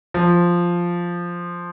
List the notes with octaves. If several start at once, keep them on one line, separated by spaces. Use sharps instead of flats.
F3